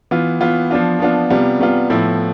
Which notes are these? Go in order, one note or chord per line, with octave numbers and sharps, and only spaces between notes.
E3 B3 F4
E3 B3 F4
F3 B3 D4 F4
F3 B3 D4 F4
C3 G3 B3 F4
C3 G3 B3 F4
A2 F3 B3 E4